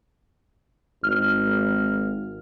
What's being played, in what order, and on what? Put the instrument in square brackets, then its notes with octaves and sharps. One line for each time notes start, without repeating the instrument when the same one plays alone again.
[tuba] G#1 [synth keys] F6